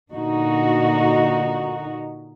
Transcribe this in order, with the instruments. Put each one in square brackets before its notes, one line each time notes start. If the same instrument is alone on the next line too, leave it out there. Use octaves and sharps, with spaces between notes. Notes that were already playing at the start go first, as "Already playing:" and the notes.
[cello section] A#2 D3 D#4 F#4